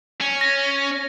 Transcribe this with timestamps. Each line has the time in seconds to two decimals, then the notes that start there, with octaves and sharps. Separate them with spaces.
0.21 C#4
0.41 A#6